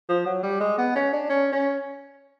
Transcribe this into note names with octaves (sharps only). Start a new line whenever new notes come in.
F3
F#3
G3
G#3
B3
C#4
D4
C#4
C#4